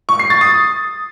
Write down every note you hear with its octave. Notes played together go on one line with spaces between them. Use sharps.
C#6
C7
A6
D#6